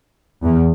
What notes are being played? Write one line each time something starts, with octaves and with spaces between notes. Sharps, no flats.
E2